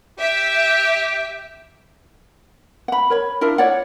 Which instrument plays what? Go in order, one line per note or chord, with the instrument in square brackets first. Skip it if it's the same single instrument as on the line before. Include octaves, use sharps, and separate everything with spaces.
[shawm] G4 [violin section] E5
[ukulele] F#5 B5
A#4 C#5 B5
D4 E4 F4 A#4
C#5 D5 F#5